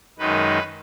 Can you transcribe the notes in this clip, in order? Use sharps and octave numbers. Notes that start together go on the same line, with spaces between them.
F#2 D#3 G#3 D#4 B4